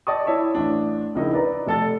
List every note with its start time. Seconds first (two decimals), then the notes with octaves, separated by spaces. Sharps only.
0.07 D5 D#5 G5 A5 C#6 D#6
0.26 E4 C#5 E5 A5
0.55 A1 D4
1.15 A#1 C#3 D#4 E4 A#4
1.33 B4 D5 A#5
1.67 F1 A4 A6